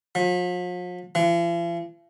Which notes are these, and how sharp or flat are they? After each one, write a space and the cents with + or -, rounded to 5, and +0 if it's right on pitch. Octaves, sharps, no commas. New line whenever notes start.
F3 +45
F3 -45